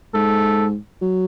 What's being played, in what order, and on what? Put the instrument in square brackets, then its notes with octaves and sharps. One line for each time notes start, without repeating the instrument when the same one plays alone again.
[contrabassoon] G#2 [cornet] A4
[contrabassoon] F#3